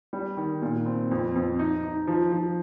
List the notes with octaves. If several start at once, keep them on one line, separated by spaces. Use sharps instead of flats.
G3
D#3
A#2
C4
F2
F2
D#4
D#4
F3
F3